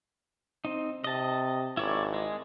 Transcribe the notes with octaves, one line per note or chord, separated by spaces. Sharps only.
C4 D#4
C3 D#5 A5
G#1 E4 C#5 D5
G#3